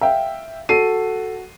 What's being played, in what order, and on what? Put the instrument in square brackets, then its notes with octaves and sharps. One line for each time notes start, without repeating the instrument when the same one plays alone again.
[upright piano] E5 F5 G5
[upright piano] F#4 [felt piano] A4 C7 D#7